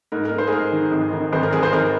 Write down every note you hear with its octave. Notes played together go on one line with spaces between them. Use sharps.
G#2 A#4
A#4
G#2
C5
G#4
G#2 A#4
D#3
G#1
D#3
G#1 C5
A#4
G#1 G#4
C5
G#1 A#4